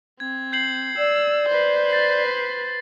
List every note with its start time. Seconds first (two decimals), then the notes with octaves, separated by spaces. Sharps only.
0.20 C4 G#6
0.52 G6 C7 F#7
0.98 D5 E6
1.49 B4 C5
1.89 A6 B6 C7